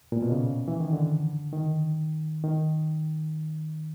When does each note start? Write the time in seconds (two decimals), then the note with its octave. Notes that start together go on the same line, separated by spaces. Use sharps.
0.12 A#2
0.22 B2
0.32 C#3
0.68 E3
0.80 D#3
0.93 D3
1.53 D#3
2.44 D#3